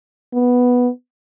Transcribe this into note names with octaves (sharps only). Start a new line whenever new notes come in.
B3